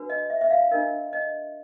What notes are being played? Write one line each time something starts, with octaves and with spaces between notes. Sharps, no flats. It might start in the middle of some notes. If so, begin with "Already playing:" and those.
Already playing: D4 F#4 B4
D#5
E5
E5
F5
D4 F4 A#4 D#5
D#5